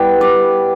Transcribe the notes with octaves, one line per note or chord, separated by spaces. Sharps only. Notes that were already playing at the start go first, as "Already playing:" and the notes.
Already playing: G3 B3 E4 B4
D5